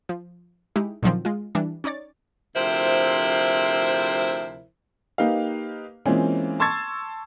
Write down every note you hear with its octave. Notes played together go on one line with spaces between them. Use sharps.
F3
G#3 D#4 E4 G4
A#2 D3 D#3 F3 F#3 C4
G#3 F4
E3 G3 D4
C#4 D#4 C#5 D5 A6
D2 C3 F3 E4 A#4 C5
A#3 D#4 G4 B4 F5
E3 G#3 A#3 C4 C#4 F4
A5 C6 C#6 E6 G#6 A6